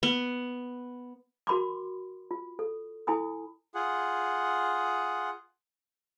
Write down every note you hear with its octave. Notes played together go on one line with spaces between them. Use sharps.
B3
F#4 A#4 B5 C6 D6
F4
A4
E4 A4 G#5 B5 D#6
F4 G#4 F#5